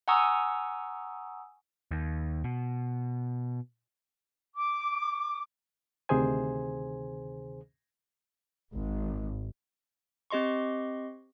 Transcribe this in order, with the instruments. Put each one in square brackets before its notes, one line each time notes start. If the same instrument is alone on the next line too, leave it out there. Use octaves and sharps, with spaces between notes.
[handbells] F#5 G#5 A#5 C#6 D#6 E6
[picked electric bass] D#2
B2
[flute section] D6
[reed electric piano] D2 C3 D#3 G#4 C5 G#5
[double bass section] G#1
[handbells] C4 G4 D#5 C6 C#6